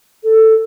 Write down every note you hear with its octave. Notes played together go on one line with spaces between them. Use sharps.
A4